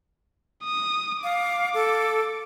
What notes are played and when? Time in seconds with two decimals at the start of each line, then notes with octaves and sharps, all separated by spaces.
0.64 D#6
1.24 F5 D6
1.74 A4